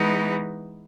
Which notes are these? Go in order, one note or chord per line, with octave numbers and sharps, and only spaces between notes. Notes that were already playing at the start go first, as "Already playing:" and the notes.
Already playing: E3 G#3 B3 D#4